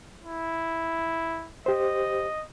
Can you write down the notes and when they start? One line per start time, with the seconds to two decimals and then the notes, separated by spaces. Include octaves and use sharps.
0.24 E4
1.66 G4 C5 D#5